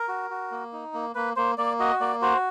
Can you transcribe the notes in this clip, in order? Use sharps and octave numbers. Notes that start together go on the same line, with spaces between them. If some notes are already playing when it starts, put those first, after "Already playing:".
Already playing: A#4
F#4
F#4
A#3
D#4
A#3
A#3 B4
A#3 C5
A#3 D5
F#4 D#5
A#3 D5
F#4 C5